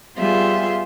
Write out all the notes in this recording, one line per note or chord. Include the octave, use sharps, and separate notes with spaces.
G3 B3 F4 G#4 E5 C6